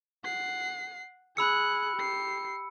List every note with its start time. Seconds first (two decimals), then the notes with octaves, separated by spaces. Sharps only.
0.24 F#5 C7
1.37 G#4 B5 E6 F#6 C#7
1.96 G4 C7